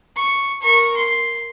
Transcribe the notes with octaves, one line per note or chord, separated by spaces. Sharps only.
C#6
A#4 C#6
C6